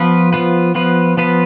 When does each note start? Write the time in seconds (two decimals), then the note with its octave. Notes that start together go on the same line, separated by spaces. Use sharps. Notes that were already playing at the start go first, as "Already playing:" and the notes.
Already playing: F3 B3 F4 B4
0.33 F3 B3 F4 B4
0.75 F3 B3 F4 B4
1.17 F3 B3 F4 B4